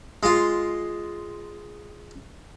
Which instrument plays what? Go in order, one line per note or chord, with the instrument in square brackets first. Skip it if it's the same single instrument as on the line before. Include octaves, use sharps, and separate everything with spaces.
[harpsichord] G#3 F4